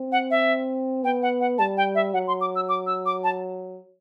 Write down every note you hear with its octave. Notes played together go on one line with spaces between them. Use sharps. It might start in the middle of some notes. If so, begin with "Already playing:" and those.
Already playing: C4
F#5
E5
B3 G5
F#5
F#5
G3 A5
G5
E5
F#3 F#5
C6
D6
E6
D6
E6
D6
A5